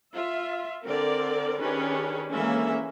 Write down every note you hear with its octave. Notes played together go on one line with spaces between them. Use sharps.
F4 E5
D3 C4 A#4 D5
D#3 C#4 D4 G4 G#4 B4
D3 E3 G#3 A#3 C#4 E5